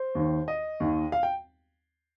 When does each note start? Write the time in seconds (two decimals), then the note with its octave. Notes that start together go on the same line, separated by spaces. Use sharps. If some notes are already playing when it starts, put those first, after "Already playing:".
Already playing: C5
0.15 D#2 D#3
0.48 D#5
0.80 D#2 D#3
1.12 F5
1.23 G5